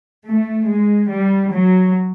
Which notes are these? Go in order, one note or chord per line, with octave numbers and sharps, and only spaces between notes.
A3
G#3
G3
F#3